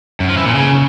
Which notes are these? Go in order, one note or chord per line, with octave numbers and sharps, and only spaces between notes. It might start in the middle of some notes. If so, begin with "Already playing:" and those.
F#2
F3
E3
A#2
C#3